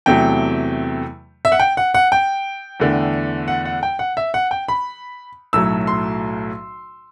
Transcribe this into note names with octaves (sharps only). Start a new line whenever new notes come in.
E2 C3 F#3 A3 G5
E5
F#5
G5
F#5
F#5
G5
E2 D3 A3
F#5
F#5
G5
F#5
E5
F#5
G5
B5
B1 A2 F#3 A3 E6
C6